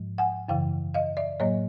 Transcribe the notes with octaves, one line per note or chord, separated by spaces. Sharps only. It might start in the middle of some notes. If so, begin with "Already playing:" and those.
Already playing: G#2 F3 G#3
F#5 G#5
F#2 C#3 E3 F5 G5
D#5 F5
D5 E5
A2 F#3 A#3 C#5 D#5